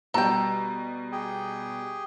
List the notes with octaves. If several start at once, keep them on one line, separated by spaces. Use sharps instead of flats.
B2 G3 A4 G5 A#5
G4 G#4